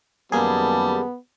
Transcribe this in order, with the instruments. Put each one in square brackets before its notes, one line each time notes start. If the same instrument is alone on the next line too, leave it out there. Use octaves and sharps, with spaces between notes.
[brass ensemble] F#2 D#3 A5 [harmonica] G3 [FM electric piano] A#3 G#4 [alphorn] B3